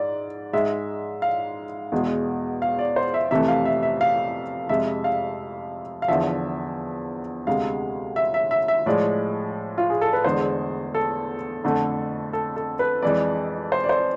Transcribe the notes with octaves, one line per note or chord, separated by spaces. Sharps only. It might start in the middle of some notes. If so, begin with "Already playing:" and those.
Already playing: G#2 D5
G#2 G#3 E5
F5
E2 B2 G#3
F5
D5
C5
E5
F2 C3 E3 A3 E5
F5
E5
E5
F5
F2 C3 G#3 E5
F5
F5
E2 D3 F3 E5
D2 C3 G#3 F5
E5
E5
E5
E5
A2 F3 G#3 D5
F4
G#4
A4
B4
E2 D3 G#3 C5
A4
F2 D3 A3
A4
A4
B4
F2 E3 G#3 D5
C5
D5
C5